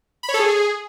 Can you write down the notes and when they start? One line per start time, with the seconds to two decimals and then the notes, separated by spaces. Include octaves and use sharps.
0.23 B5
0.29 C#5
0.34 A4
0.39 G#4